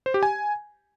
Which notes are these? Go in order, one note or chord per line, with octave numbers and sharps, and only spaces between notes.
C5
G4
G#5